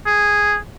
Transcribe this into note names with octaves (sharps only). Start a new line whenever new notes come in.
G#4